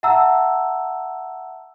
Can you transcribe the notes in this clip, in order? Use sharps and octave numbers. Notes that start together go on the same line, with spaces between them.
E5 F#5 A5 A#5 E6